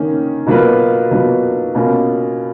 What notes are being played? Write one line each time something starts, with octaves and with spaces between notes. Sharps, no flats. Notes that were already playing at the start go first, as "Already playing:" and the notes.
Already playing: D#3 A#3 C#4
B2 F#3 A#3 F4 B4
B2 F#3 A#3 F4 B4
B2 A#3 C#4 F4